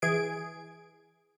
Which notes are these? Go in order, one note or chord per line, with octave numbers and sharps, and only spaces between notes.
E3 G#4 G#6 D7